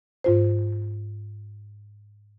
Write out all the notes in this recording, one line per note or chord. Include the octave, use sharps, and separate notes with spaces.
G#2 F4 C5